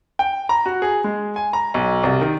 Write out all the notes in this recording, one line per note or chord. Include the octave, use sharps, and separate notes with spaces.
G5
A#5
F#4
G#4
G#3
G#5
A#5
B1
C2
D#3